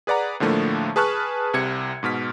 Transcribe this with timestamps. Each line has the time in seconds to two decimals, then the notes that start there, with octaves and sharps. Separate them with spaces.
0.07 G#4 B4 D5 F#5 A#5
0.40 A2 D3 F3 A3 A#3
0.96 G#4 B4 A5 C#6 F6 F#6
1.53 C2 C3 G#6 C#7
2.03 G#2 B2 F6 B6